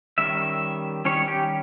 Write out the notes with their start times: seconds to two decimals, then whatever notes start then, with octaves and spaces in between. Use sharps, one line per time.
0.18 D#3 G3 C#4 E5
1.05 D#3 G3 C#4 C#5
1.28 G4